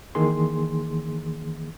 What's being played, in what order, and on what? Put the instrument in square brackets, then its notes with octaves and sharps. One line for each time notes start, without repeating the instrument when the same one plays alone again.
[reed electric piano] D#3 E3 A#3 G#4 C6